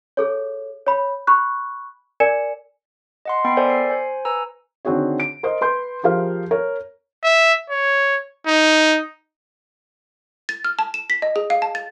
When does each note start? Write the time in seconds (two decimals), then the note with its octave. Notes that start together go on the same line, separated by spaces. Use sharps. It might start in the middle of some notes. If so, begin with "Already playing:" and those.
0.17 G#4 A4 C#5
0.86 C#5 B5
1.27 B5 C#6 F#6
2.20 A#4 D5 G#5 C#7 E7
3.25 D#5 F#5 C6
3.45 B3 G5 B5 C7
3.57 A4 A#4 C5 D5 E5 G#5
3.70 C7
3.89 C5 G#5
4.25 B4 G#5 A#5 E6
4.85 D3 D#3 C4 F#4 G#4 C#5
5.20 D7
5.43 A#4 C5 D#5
5.61 B4 C6 G6
6.03 F3 G4 G#4 A#4 C5 F5
6.51 A#4 C#5
7.24 E5
7.70 C#5
8.47 D#4
10.49 A6
10.65 F6
10.79 A5
10.94 E7
11.10 B6
11.22 D#5
11.36 G#4
11.50 F5
11.62 A5
11.75 A6